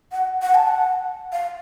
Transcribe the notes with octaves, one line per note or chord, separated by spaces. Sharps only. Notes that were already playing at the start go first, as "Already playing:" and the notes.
F#5
F#5
A5
F#5
F5